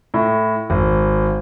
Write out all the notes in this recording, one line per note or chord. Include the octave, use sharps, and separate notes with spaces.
A2
G#1